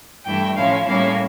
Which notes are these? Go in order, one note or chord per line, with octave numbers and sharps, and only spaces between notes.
G2 E3 A3 E4 G5
A2 F3 C#4 E4 F5
A2 G3 A#3 C#4 E4 F5